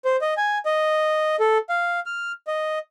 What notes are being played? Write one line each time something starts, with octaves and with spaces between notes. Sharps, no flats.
C5
D#5
G#5
D#5
A4
F5
F6
D#5